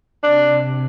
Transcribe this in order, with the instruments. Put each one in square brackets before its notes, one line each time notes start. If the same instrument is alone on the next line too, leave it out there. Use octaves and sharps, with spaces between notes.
[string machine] C3 [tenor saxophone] D4